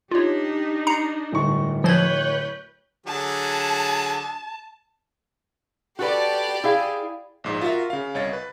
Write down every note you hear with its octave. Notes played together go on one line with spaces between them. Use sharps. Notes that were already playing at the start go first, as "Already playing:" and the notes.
D4 D#4 F4 G4 C#5
A#5 C7 C#7
D1 G2 C#6
F3 B4 C#5 G6 G#6
D3 F#3 G#4 A5
F#4 G4 A4 B4 D5
E4 G#4 F5
A#1 G#2
F4 F#4 A#4 E5
C#3 F5
C2 C#5 D#5 A6
B4